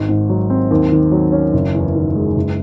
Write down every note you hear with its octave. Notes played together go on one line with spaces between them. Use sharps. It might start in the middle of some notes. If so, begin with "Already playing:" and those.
Already playing: G#1
G#2
F#3
C4
D#2
D#3
F#3
C#4
F#1
E2
D#3
G#3
F#1